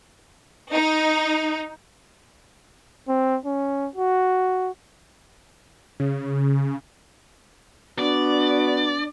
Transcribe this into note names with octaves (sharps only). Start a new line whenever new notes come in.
D#4
C4
C#4
F#4
C#3
B3 D4 F#4 D5